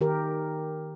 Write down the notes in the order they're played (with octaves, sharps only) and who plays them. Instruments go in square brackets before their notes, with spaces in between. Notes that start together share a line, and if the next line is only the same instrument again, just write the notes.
[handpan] D#3 G4 A#4